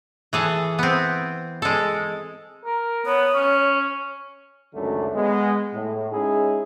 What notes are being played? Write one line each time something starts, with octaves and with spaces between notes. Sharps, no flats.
E3 G#4 A4
B3 C4
G#3 A4
A#4
B3 C#5
C#4
C#2 F#2 D3 D#3 F#3 A3
G#3 B3
A2
G#3 C#4 D#4 E4 G#4